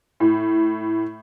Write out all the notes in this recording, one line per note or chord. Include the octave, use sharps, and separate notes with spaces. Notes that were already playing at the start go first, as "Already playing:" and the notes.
A2